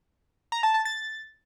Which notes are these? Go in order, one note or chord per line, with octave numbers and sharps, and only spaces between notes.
A#5
A5
A5
A6